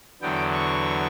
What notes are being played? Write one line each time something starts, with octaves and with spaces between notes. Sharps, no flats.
E2 D3 F#3 B3 G5
C#6